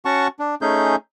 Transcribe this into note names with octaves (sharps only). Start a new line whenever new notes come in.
C#4 F#4 F#5 A5 C#6
D4
A3 C#4 D#4 G#4 G6